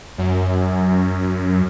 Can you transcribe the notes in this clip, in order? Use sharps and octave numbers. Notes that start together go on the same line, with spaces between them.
F#2